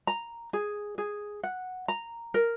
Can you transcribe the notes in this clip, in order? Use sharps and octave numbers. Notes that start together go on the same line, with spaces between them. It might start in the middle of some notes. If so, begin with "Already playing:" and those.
A#5
G#4
G#4
F#5
A#5
A#4